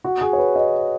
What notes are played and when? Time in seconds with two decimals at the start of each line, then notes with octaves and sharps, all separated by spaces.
0.04 F#4
0.21 G#4
0.33 C#5
0.38 B4
0.56 D#5